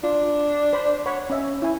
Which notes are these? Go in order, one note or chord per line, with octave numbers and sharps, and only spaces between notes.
D4 F4
C5 B5
C#5 F#5 B5
C#4 D#5 E5
E4 G#5